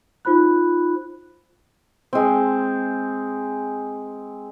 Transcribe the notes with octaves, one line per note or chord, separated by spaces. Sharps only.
D#4 F4 C5 B5 F#6
G#3 C4